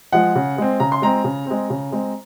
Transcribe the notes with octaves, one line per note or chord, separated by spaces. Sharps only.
F3 G#3 F#5
C#3
G#3 C4
C#3 A#5
C6
G#3 C4 A#5
C#3
G#3 C4
C#3
G#3 C4